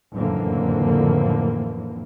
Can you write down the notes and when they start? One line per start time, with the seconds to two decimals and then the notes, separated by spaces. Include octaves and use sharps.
0.12 F#1 F2 A2 D3 E3 A#3